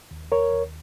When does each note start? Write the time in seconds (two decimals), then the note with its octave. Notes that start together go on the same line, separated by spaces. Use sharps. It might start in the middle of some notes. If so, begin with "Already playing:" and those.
0.11 D#2
0.31 D#2 A#4 C#5
0.53 D#2